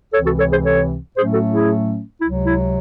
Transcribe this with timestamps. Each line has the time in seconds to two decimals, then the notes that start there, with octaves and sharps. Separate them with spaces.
0.13 C#2 C3 E3 C4 A4 C#5
0.26 F#4 A4
0.39 A4 C#5
0.52 G#4 C5
0.65 A4 C#5
1.17 A2 F#3 A3 C#4 G#4 C5
1.34 F#4 A4
1.51 E4 G#4
2.20 C#2 C3 F#3 E4
2.46 E4